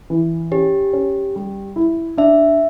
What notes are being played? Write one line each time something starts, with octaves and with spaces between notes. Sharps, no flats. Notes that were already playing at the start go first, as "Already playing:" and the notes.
E3
C#4 G4
C#4
G3
E4
D4 E5